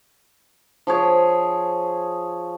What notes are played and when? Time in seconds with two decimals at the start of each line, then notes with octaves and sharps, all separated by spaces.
0.87 F3 G#4 C#5